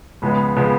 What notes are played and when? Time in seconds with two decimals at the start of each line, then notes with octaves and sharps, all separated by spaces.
0.22 C#2 C#3 F3 G#3 B3
0.57 C#3 F3 G#3 B3